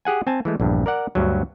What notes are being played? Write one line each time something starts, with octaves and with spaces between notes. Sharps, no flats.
G4 G#4 F#5 G#5
C4 G#5 A5
E3 G#3 A3
A#1 E2 G2
A#4 D5 F#5
D2 G2 F#3